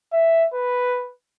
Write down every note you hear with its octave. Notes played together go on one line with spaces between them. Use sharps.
E5
B4